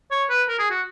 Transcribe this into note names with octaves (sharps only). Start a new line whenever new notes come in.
C#5
B4
A#4
G#4
F#4